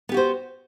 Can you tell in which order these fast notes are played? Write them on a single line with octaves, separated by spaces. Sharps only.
B3 G4 F#4 C5